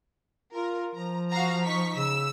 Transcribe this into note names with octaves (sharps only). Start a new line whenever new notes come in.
F4 A#4
F3 A#5
F#4 F5 A#5
D#4 C#6 B6
C#3 E6